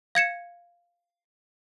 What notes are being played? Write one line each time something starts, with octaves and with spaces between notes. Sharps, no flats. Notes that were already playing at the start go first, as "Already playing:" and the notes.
F5 G#6 C#7 E7